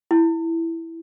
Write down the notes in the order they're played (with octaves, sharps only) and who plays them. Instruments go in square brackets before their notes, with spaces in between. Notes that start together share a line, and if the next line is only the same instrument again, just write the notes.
[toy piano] E4